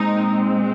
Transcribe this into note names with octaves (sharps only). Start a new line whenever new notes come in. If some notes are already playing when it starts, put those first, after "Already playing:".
Already playing: A#2 G#3 C4 D#4